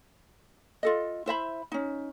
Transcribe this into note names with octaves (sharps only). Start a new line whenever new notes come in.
F4 A4 D#5
E4 C5 E5 B5
C#4 D#4